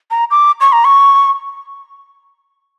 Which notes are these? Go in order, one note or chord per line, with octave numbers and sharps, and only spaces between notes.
A#5
D6
C#6
A#5
C#6